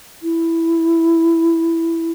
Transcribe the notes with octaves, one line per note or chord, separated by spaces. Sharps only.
E4